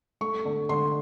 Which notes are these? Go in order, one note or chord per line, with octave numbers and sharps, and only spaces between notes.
A3 C#6
D3
D3 C6